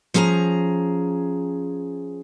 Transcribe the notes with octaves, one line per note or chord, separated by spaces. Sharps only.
F3 C#4 G#4 G5 A#5